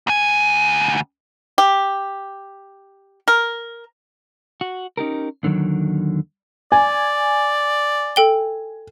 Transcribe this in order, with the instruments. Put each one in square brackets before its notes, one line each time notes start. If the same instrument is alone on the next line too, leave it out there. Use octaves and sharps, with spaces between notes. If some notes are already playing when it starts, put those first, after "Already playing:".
[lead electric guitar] D2 G#5
[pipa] G4
A#4
[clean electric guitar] F#4
C#4 D#4 G4 A#4
D#2 D3 D#3 F#3
[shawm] D5 [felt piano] G#5
[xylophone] A4 G5 G7